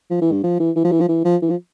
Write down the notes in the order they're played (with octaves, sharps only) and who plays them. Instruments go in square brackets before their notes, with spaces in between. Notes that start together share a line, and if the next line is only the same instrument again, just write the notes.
[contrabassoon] F3
E3
G2
F3
E3
E3
F3
E3
F3
E3
F3
E3
F3